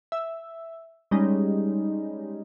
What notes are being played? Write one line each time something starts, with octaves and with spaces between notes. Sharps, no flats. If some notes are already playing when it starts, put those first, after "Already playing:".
E5
G3 G#3 C#4 D#4